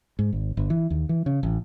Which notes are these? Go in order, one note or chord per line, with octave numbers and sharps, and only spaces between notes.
G#2
G#1
G1
E3
D#2
E3
C#3
A1